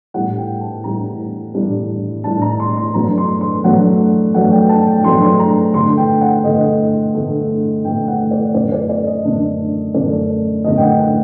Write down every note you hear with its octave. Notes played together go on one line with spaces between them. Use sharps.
A2 G3 D4 F#5
G5
A5
A2 G3 D4 A#5
A2 G3 D4
A2 G3 D4 A5
A#5
C6
C6
G2 F#3 A3 D4 A#5
C6
C6
G2 F#3 A3 D4 F#5
G2 F#3 A3 D4 F#5
G5
A5
G5
G2 F#3 A3 D4 C6
C6
A#5
G2 D3 A3 C6
G5
F#5
G2 D3 A3 D#5
G2 D3 A3
G2 D3 A3 G5
F#5
D5
F#2 D3 A3 D4 D5
D5
D5
D#5
F#2 D3 A3 D4
F#2 D3 A3 D4 D5
F#2 D3 A3 D4 D#5
G5
F#5
F#5